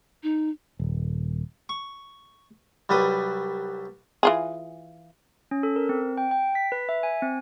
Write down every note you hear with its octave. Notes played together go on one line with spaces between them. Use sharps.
D#4
D#1
C#6
C2 F#3 G3 B4 D#6
E3 F4 G#4
C#4
A4
A#4
C4
G5
G5
B6
B4
E5
G#5
C4